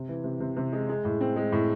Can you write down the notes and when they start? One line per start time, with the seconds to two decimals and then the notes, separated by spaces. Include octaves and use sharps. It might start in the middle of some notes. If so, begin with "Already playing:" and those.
Already playing: C3
0.08 E3
0.24 C3
0.40 C3
0.56 C3
0.72 G#3
0.89 G#3
1.05 A2
1.21 C4
1.36 G#3
1.52 A2